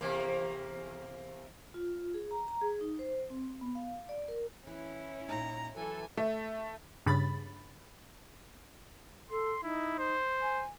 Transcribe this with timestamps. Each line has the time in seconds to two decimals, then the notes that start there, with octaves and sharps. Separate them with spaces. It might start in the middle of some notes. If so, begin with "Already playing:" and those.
0.01 E2 C3 A#3
1.74 F4
2.14 G#4
2.31 A#5
2.48 A#5
2.62 G#4
2.81 D#4
2.99 C5
3.30 C4
3.61 B3
3.75 F5
4.09 D5
4.28 A#4
4.67 E3 C#4 E4
5.29 A#2 D#4 A#5
5.76 E3 F#3 A4 G#5
6.17 A3
7.06 G2 C#3 B5 A6
9.31 A4 C6
9.63 D#4 E4
9.99 C5
10.42 G#5